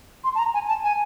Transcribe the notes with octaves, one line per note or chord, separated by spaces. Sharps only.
C6
A5
A#5
G#5
A5
G#5